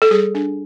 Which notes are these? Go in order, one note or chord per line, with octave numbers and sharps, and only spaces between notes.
A4
G3 G#4
D4